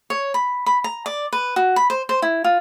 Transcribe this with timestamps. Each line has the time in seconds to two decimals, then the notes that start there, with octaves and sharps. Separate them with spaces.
0.10 C#5
0.34 B5
0.66 B5
0.84 A#5
1.06 D5
1.33 B4
1.56 F#4
1.76 B5
1.90 C5
2.09 C5
2.22 E4
2.44 F4